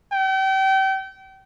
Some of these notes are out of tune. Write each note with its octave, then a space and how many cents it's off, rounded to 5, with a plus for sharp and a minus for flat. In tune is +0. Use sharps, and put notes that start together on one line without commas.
G5 -35